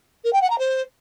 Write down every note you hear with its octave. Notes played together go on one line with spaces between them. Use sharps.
A#4
G5
F#5
A#5
C5